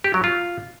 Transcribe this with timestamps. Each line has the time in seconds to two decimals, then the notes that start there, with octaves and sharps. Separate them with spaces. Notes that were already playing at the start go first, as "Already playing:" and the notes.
0.04 G4
0.14 F#3
0.24 F4